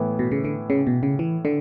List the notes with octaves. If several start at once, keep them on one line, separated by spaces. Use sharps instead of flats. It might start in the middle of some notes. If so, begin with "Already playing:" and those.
Already playing: A2 E3 B3
B2
C#3
D3
C#3
B2
C#3
E3
D3